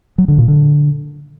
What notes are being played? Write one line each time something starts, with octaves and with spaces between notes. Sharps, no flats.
F#3
D3
A#2
D3